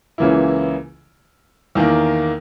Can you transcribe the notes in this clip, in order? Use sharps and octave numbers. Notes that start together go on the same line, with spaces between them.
C#2 C#3 E3 A#3 E4
E2 D#3 A#3